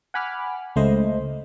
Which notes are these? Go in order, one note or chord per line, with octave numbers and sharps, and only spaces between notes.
F#5 G#5 B5 D6 F6
C#2 A3 C5 D#5